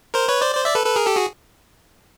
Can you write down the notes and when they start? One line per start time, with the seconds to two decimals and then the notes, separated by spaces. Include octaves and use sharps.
0.14 A#4 C5
0.28 B4 C#5
0.41 C5 D5
0.55 C5 D5
0.65 D5 E5
0.75 A4 B4
0.86 A4 B4
0.96 G#4 A#4
1.07 G4 A4
1.16 F#4 G#4